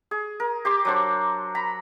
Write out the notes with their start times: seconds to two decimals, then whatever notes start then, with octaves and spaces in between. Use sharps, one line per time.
0.11 G#4
0.40 A#4
0.65 G4 C6 D6
0.85 F#3 D4 C5
1.55 A#5 B5